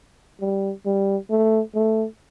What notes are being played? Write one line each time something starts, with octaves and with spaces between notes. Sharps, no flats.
G3
G3
A3
A3